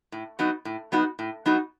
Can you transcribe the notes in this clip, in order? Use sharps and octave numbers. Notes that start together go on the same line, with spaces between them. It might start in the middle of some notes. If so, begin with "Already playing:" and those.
A2
F#3 B3 D#4 F#4
A2
F#3 B3 D#4 F#4
A2
F#3 B3 D#4 F#4